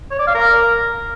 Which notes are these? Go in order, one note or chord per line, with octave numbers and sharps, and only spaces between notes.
C#5
D5
F5
A#4